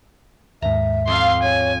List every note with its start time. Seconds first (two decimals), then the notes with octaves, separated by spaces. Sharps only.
0.62 D#2 G#2 E5 A#5
1.08 F2 C4 F4 F5 C6
1.43 C#5 G#5